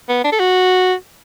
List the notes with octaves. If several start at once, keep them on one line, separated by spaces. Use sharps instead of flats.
B3
D4
A4
F#4